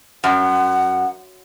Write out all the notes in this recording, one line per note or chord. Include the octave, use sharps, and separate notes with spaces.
F#2 F#5